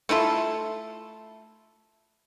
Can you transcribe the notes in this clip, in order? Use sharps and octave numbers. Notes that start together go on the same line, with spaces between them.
A3 E4 F4 A4